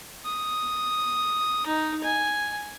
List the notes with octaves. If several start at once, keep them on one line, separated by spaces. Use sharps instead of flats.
D#6
D#4
G#5